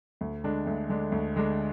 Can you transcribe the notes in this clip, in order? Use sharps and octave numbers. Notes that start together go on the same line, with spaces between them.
D2
D3 G#3 D4
D2
D3 G#3 D4
D2
D3 G#3 D4